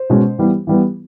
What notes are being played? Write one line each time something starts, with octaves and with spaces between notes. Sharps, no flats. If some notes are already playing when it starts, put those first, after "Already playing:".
Already playing: C5
B2 G#3 C#4
E3 G3 B3
E3 G3 B3